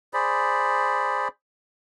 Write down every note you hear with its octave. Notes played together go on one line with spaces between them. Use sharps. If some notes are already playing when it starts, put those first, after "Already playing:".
G#4 C5 D5 B5